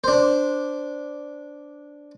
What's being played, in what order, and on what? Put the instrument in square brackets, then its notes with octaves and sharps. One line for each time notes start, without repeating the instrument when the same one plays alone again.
[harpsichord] D4 C5